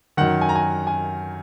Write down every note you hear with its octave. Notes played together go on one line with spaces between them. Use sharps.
F#2 D#3 F#5
G#5
A#5
G#5
G#5